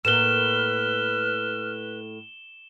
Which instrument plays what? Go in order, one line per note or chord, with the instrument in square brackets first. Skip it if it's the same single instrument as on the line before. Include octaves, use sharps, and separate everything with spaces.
[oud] A2 A#3 [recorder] B4 [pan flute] F6 [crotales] E7 G7